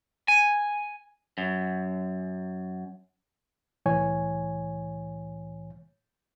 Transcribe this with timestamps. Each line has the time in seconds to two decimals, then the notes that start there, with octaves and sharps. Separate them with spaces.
0.28 G#5
1.38 F#2
3.86 C2 A2 E3 C#5 G#5